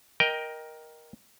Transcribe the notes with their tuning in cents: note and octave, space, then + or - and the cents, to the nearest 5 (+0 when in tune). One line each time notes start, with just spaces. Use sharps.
A#4 +10 D#5 +0 G5 +0